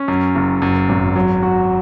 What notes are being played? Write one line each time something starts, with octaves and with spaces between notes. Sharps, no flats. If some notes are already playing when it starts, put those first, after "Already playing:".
Already playing: C#4
F#2
F#1
F#2
G#1
F#3
F#4